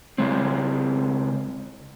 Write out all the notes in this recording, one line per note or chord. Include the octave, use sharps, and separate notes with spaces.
C#3 G#3 C4